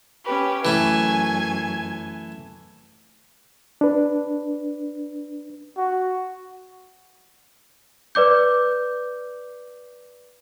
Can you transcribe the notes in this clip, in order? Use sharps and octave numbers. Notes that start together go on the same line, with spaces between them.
C#4 G4 B4
F#2 E3 A3 G#5 G#6
D4 B4
F#4
B4 D5 D6 G6